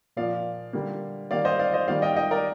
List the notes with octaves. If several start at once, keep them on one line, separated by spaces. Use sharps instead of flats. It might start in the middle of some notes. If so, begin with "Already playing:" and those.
A#2 F3 A#3 D5 F5
D3 G3 A#3
D#3 G3 A#3 D5 F5
C5 D#5
D5 F5
C5 D#5
D#3 G3 A#3 D5 F5
D#5 G5
D#5 G5
A#4 D5